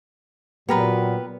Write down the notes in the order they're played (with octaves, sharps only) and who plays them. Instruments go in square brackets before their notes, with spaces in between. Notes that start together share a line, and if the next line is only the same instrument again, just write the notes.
[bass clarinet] A#2 [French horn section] F#3 [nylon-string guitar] B3 [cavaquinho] G4 A#4 B4